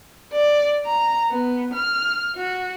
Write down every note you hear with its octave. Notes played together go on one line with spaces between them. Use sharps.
D5
A#5
B3
F6
F#4